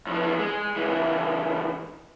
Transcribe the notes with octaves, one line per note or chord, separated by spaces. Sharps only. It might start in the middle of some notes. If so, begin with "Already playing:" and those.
F2 E3
G#3
C#2 E3